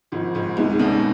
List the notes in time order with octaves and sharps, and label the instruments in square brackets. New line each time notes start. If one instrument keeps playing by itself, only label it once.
[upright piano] G#1 G#2 [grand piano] F3
[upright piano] G#1 G#2
[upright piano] C2 C3 [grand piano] G#3 B3 D#4
[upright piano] C3
B1 B2